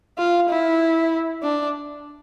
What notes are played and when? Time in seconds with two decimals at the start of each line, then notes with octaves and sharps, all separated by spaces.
0.18 F4
0.49 E4
1.43 D4